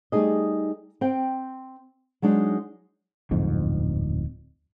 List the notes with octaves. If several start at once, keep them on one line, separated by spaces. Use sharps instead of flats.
G3 A3 D#4 G#4 D#5
C4 G5
F#3 G#3 D4 D#4
D1 F2 G#2